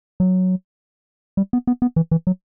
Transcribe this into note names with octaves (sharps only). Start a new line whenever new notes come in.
F#3
G3
B3
B3
B3
E3
E3
F#3